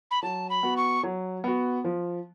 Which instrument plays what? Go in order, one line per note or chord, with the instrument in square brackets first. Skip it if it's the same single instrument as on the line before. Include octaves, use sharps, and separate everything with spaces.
[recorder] B5
[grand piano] F#3 [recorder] A5
[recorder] B5
[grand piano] B3 F#4
[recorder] C#6
[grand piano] F#3
B3 F#4
F3